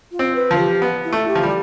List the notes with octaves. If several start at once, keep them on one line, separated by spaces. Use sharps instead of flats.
F4
C4
B4
F3
G4
B3
E4
A3
G4
F3
G3